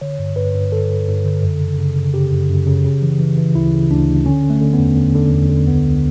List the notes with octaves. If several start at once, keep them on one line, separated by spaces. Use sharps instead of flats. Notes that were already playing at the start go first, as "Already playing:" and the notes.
D3 C#5
G2
G2 B4
G2
D3 A4
G2
G2
D3
F#2
C#3
C#3
C#3
C#3 G4
F#2
F#2
C#3
C#3
E3
E3
E3
D2 E4
C#3
D2 D4
D2
D3 C#4
D3
A3
D3
B3
E2
D3
D3
E2
D3
C#2 B3
C#2